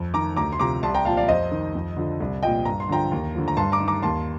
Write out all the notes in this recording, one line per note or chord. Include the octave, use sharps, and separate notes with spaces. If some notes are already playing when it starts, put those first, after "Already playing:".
Already playing: F2
D#3 A#5 D6
D2 A#5 D6
C6
C3 F3 A#5 D6
C2 A5 C6
G5 A#5
A#2 F3 F5 A5
D5 F5
F2 C5 D#5
D#3
F2
D3 F3
C2
A#2 F3 D#5 G5
G2 A#5
C6
D3 F3 G5 A#5
D#2
D3 F3
A#5
G2 A5 C6
A#5 D6
D#3
A#5 D6
D#2 A5 C6